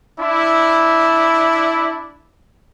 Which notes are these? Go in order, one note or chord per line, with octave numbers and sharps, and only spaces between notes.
D4 E4